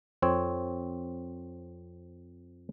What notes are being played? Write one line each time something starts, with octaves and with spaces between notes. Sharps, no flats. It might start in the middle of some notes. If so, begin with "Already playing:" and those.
F2 C4 C#5